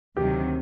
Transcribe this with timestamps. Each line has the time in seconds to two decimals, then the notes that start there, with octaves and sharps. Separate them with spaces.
0.17 D2 C3 D#3 F#3 G4